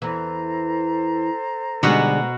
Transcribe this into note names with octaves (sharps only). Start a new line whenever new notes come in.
E2 E3 A4 C5 A#5
B2 D3 G3 G#3 B3 D#4 F#4 G4